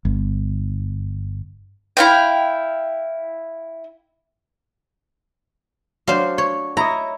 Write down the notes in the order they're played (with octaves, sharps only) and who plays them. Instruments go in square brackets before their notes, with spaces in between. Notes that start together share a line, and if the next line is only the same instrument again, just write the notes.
[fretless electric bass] G1
[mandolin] E4 F5 G5
[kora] F#3 D4 [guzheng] C5 F5
[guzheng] C#5
[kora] E4 C#5 D#5 [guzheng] A#5